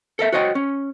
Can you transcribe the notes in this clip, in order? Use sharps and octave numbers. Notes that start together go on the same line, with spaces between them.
A4 A#4 E5
F#4 C5 C#5 D#5 F#5 G5
C#4